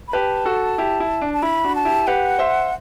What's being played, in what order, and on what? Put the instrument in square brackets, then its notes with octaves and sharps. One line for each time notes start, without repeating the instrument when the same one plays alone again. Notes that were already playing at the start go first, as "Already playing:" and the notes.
[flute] B5
[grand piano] G4 B4 [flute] A5
[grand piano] F#4 A4
E4 G4
E4
D4
[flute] A5
[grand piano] E4 [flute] B5
[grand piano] D4 F#4
[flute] A5
[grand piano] E4 G4
[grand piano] G4 B4 [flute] F#5
[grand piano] C5 E5